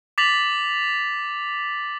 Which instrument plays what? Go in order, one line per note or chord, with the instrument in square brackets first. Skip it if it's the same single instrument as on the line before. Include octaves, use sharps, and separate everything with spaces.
[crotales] D6 A6 B6 F7 F#7